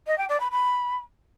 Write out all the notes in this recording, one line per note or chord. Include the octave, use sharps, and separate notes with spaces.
D#5
G5
D5
B5
B5